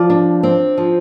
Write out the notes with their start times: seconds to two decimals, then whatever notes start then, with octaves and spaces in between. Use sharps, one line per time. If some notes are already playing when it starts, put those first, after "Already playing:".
Already playing: F3 D5
0.10 D4
0.43 C4
0.78 F3